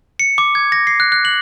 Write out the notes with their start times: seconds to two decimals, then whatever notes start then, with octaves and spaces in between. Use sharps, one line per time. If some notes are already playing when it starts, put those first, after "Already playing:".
0.19 C#7
0.38 D6
0.55 G#6
0.72 A#6
0.87 C7
1.00 F#6
1.12 F#6
1.25 F#7